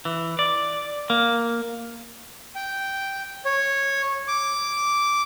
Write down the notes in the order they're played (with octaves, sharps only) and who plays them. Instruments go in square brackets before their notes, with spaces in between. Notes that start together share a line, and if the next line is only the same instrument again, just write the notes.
[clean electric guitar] E3
D5
A#3
[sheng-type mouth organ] G5
C#5
D6